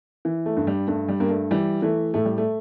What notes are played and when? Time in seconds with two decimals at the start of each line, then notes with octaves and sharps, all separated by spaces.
0.25 E3
0.46 A3
0.57 G2
0.67 G3
0.88 G2 A3
1.08 G3
1.20 G2 A#3
1.30 A3
1.51 E3 G3
1.82 E3 A3
2.14 A2 A3
2.25 G3
2.38 A3